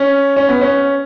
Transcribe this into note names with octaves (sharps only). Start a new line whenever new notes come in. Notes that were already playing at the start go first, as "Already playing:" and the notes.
Already playing: C#4
C#4
B3
C#4